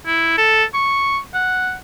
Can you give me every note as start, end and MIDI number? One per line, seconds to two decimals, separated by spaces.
0.06 0.34 64
0.37 0.64 69
0.74 1.18 85
1.34 1.74 78